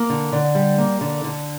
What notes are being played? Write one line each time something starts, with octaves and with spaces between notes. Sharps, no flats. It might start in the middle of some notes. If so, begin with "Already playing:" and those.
Already playing: A#3
D3
D3
G3
A#3
D3
D3